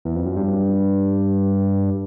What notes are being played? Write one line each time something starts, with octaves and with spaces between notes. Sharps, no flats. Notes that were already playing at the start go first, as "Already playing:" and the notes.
E2
F2
F#2
G2